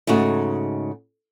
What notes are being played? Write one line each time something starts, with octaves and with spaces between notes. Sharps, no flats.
G#2 C#3 A3 D#4 F#4